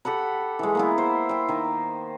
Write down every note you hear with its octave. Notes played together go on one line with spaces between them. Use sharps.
G4 A4 F#5 B5
E3 G#3
A#3 B3 E4
C5
G5 C6
D#3